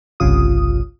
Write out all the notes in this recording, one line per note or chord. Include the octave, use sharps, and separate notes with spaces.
G1 C2 G2 C#3 F4 D#6